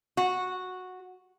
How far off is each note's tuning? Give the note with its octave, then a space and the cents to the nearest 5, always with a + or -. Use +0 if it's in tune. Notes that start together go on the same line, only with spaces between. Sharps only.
F#4 -10